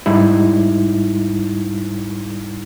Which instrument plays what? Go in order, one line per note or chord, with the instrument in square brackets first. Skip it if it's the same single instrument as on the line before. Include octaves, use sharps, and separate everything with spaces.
[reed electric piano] G#2 G3 D#4 E4